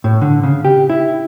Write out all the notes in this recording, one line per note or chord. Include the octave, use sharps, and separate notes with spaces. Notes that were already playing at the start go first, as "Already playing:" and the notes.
A2
D3
C#3
G4
E4